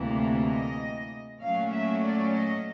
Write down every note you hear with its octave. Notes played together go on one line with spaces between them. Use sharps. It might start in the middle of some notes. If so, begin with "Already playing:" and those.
Already playing: D2 C3 E3 G3 A#3
D#5
A#2 F#3 A3 C#4 F5
E5
D5
D#5